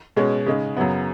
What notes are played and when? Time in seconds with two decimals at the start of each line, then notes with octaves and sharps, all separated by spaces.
0.16 B2 G#3 C#4
0.46 C#3 G#3 D#4
0.77 F#2 C#3 F#3 B3